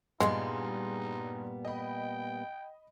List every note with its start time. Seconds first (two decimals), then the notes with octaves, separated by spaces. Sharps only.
0.20 G2 A#2 G3 G#3 B3 D#4 G#4 C6
1.65 D#5 G5 B5